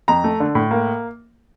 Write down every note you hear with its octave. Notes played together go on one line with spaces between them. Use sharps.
F2 A#5
A3
D3
A2
A#3